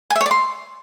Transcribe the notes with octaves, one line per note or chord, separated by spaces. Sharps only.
G#5
E5
C#5
D5
C6